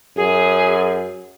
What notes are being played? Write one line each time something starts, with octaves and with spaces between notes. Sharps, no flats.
F#2 G#4